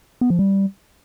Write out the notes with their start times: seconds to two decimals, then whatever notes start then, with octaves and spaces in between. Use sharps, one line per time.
0.21 B3
0.30 F3
0.39 G3